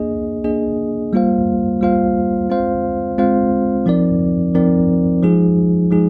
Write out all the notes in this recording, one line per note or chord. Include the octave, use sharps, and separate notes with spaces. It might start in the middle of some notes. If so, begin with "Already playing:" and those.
Already playing: A#3 D4 G#4 D#5
A#3 D4 G#4 D#5
G3 A#3 F4 C5 F5
G3 A#3 F4 C5 F5
G#3 C4 F4 C5 F5
G#3 C4 F4 C5 F5
F3 C4 D#4 A#4 D5
F3 C4 D#4 A#4 D5
F3 G#3 D#4 G#4
F3 G#3 D#4 G#4